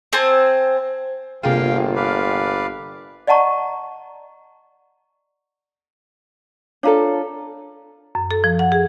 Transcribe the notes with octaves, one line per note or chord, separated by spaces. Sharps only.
C4 C5 G#5 A5
G1 C3 A#3 F4 G#4 F5 G5 D#7
B4 D5 F5
D5 D#5 F#5 A5 A#5 C#6
D4 F4 A4 C#5 F5 A#5
F#2
A4
F3
F#5
G#4